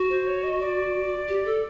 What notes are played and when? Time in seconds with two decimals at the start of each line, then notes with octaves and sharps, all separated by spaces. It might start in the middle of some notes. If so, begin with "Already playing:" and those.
Already playing: F#4
0.10 C5
0.26 C#5
0.43 D#5
0.60 D5
1.28 G4
1.45 A4